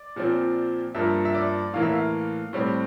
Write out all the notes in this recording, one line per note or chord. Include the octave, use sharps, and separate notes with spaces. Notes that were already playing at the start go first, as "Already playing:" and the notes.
Already playing: D5
A#2 F3 C4
G2 F3 A#3 E5
E5
D5
A2 E3 A#3 F5
E5
F5
A2 G3 C4